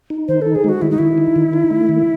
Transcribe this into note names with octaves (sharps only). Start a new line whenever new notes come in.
D#4
D#3 C5
D#4 A4
G#4
G#3 F#4
D#3 E4
D#4
D#3 E4
D#4
D#3
D#4
A3
D#3